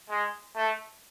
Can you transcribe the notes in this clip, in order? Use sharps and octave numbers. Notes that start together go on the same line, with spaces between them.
G#3
A3